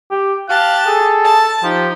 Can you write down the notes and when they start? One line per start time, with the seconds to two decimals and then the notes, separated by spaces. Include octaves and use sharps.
0.11 G4
0.49 G4 F5 A5 F#6
0.86 G#4 A4
1.25 A5
1.63 F3 D#4 G4